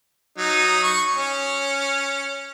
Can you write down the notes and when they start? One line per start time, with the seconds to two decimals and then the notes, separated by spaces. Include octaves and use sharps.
0.38 F#3 D#4
0.83 C#6
1.16 C#4